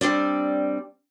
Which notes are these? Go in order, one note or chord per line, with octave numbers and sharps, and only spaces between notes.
G3 C4 D4 D5